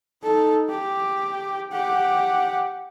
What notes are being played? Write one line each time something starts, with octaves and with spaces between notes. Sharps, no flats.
D#4 A4
G4
G4 F#5